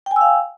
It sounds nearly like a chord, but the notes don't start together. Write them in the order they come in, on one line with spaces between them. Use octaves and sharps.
G5 G#5 E6 F5